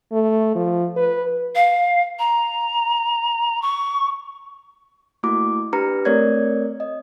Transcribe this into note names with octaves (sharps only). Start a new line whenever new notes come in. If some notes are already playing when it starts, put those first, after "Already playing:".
A3
F3
B4
F5
A#5
C#6
A3 A#3 E4 F#4 D6
D4 G4 B4 A#5 F6 C#7
A3 C4 A#4 C#5 D5 G#6
D#5